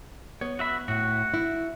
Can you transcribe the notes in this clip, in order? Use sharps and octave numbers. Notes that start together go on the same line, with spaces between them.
B3 C#5
F#4 E5 B5
A2 F#4
E4